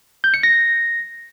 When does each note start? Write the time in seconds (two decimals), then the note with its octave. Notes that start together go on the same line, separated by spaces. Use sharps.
0.24 G6
0.34 C#7
0.43 A#6